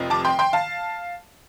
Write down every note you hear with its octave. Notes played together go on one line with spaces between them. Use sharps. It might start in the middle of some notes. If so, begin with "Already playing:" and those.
Already playing: F1 F2 C3 F3
A5 D6
G5 C6
G5 C6
F5 A5